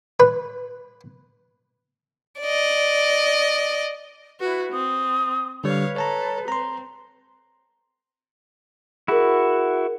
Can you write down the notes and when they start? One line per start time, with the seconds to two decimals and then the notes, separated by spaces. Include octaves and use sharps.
0.20 B4
2.42 D5 D#5
4.40 E4 F#4 B4
4.72 C4 D#6
5.64 D3 G3 B4 C#5 F5
5.96 A4 C#5 A5 A#5
6.48 C4 A#5 C6
9.08 E4 F#4 G#4 A#4